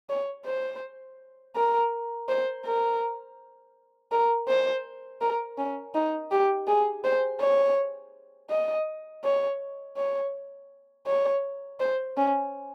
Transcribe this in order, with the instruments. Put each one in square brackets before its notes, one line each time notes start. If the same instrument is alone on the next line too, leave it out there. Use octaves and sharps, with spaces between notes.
[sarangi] C#5
C5
A#4
C5
A#4
A#4
C5
A#4
C#4
D#4
G4
G#4
C5
C#5
D#5
C#5
C#5
C#5
C5
C#4